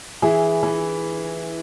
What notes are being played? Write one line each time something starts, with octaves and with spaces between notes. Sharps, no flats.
E3 E4 G#4
E3